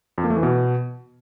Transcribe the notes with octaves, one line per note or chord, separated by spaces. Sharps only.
F2
A#3
A3
E3
B2